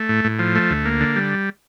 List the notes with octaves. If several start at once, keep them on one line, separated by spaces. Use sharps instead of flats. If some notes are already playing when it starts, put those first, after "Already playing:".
Already playing: A3
A2
A2
F3
A3
D2
A#3
D3
G3